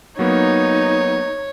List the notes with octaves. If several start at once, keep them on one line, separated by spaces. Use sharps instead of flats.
F#3 A#3 B3 D#4 C#5